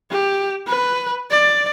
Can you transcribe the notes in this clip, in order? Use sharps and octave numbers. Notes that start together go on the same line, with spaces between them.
G4
B4
D5